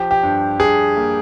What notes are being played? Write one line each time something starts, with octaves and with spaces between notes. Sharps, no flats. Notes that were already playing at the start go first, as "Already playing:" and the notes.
Already playing: F3 G4
G4
G2
G2 G#4
A#3